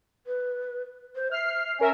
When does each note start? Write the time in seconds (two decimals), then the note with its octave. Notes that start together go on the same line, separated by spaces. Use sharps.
0.27 B4
1.16 C5
1.31 E5 F6 C7
1.79 C#4 A#4 E5 G#5